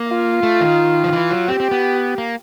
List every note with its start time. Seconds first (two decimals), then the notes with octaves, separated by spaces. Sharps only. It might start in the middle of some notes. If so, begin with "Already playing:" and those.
Already playing: A#3
0.08 F4
0.43 A3
0.61 D#3
1.04 F3
1.13 E3
1.31 F#3
1.48 C4 G4
1.60 C4
1.71 B3
2.18 A#3